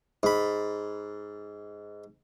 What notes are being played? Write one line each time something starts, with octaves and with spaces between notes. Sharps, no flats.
G#2 B5